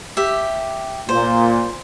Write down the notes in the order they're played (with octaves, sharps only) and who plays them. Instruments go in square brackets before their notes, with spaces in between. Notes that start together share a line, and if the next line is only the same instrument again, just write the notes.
[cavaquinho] G4 E5
[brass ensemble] A#2 [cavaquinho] C5